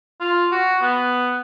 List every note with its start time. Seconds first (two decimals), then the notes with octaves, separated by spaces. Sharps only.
0.20 F4
0.52 F#4
0.81 B3